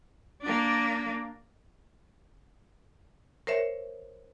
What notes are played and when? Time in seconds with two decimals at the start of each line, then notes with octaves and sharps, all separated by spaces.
0.42 A#3 D4
3.47 A#4 C5 C#5 E5